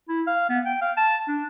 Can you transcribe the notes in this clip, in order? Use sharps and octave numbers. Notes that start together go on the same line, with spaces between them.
E4
F5
B3
G5
F5
A5
D4